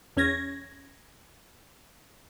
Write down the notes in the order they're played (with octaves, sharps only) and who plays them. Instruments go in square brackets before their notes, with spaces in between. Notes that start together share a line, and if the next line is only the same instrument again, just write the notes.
[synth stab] E2 C#4 G#6 A#6